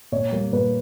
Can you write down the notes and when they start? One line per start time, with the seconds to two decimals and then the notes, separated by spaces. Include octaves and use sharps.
0.12 A#2 C#5
0.32 G3 A#3
0.52 A#2 B4